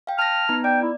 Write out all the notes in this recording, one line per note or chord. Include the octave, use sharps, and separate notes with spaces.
F5 G5
A5 F6 A#6
B3 D#4 A#5
D5 G5
E4